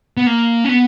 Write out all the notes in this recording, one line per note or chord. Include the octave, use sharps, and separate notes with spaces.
B3
A#3
C#4
B3